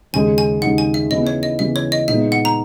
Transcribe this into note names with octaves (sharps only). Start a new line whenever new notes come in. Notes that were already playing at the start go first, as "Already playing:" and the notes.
D#2 C#3 G#3 D#4 G#5
G#5
D#2 C#3 G#3 D#4 F#5
G#5
E5
C#3 E3 B3 E4 D#5
C#5
D#5
C#3 E3 B3 E4 E5
C#5
D#5
A#2 G#3 B3 D#4 E5
F#5
A#5